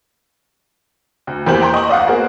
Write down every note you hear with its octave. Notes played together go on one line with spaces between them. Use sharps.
D2
E2 A#3 G4 C5 G6 F#7
G5 A#5 C6
D#5 C#6 F#7
D5 D#5 F5 F#5
A#3 B3 F#4 G#4 C5